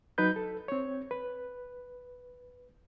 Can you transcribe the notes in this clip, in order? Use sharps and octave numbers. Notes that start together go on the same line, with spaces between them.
F#3 D#4 B4 G6
A4
C4 C#5
B4